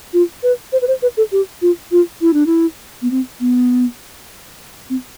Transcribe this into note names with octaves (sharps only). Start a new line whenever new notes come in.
F4
B4
C5
B4
C5
B4
A4
G4
F4
F4
E4
D4
E4
B3
C4
B3
C4